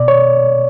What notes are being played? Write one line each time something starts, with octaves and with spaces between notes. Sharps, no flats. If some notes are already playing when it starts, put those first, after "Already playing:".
Already playing: B2 D5
C#5